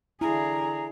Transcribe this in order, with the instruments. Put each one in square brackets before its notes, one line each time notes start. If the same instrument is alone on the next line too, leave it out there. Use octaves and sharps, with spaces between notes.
[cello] D3 G#4 [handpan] E4 [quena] A#5